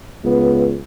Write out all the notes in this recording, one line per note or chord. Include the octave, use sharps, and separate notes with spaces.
C#2 B3